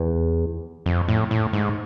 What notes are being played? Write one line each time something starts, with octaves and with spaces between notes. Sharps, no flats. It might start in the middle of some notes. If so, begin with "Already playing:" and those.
Already playing: E2
F2
A2
A2
G#2